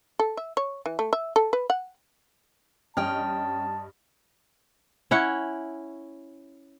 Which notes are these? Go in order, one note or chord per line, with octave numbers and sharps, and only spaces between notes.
A4
E5
C#5
E3
A3
E5
A4
B4
F#5
G2 C#4 D#5 G5 A5 F6
C#4 E4 F#5